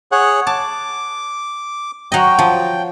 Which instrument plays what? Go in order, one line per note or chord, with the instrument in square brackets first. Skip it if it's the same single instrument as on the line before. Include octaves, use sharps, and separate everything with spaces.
[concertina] G#4 C#5 F#5
[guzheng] A5 [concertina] D6
[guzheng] F#3 D#5 [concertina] G5
[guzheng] F3